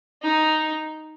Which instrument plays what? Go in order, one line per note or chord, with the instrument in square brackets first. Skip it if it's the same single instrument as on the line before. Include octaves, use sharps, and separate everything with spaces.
[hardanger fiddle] D#4